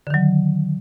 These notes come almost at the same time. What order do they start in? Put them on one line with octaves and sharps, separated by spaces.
D3 D#3 F#3